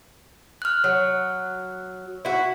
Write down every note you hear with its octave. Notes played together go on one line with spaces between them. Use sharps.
F6 F#6
F#3
E4 F#4